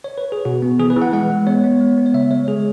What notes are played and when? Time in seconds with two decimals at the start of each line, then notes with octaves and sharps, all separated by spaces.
0.04 C#5
0.18 B4
0.32 G#4
0.45 B2 F#4
0.62 B3
0.79 E3 G#4
0.90 B4
0.96 E3
1.02 F#5
1.13 G#3 F#5
1.30 G#3
1.47 B3 C#5
1.64 B3
1.80 G#3
1.97 B3
2.06 C#5
2.14 C#3 E5
2.31 G#3 C#5
2.47 G#3 G#4